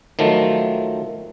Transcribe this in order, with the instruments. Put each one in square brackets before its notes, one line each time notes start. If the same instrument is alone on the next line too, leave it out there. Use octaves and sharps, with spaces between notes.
[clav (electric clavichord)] D#3 F3 F#3 A3